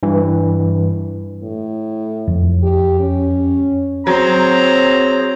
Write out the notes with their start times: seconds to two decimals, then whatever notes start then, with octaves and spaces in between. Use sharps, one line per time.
0.03 G2 E3
1.43 A2
2.28 F2
2.63 G4
3.00 C#4
4.07 F#3 C4 G#4 C5 C#5 A#5